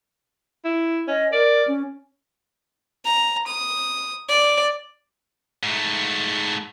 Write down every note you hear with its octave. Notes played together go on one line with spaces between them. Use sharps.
E4
C#4 D#5
A#4 D5
C#4
A#5
D#6
D5
G#2 A3